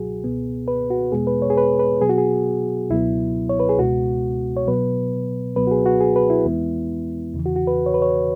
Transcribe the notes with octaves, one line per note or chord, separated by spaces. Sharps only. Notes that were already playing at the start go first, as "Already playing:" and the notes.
Already playing: C#2 B2 F#3 F#4 G#4
C#2 B2 B3
B4
F#4
E2 B2 G#3 B3 G#4
B4
C#5
G#4
B4
B4
B2 F#3 B3 G#4
F#4
G#4
C#2 B2 F#3 B3 E4
C#5
B4
G#4
C#2 B2 G#3 B3 F#4
C#5
B2 F#3 B3 B4
C#2 B2 F#3 B3 B4
F#4
G#4
F#4
G#4
B4
E4
E2 E3 G#3 B3
E2 C#3 E3
F#4
F#4
B4
C#5
B4
C#5